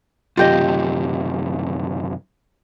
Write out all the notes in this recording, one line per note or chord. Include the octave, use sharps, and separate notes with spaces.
F#2 C3 D#3 F4 G4 D#5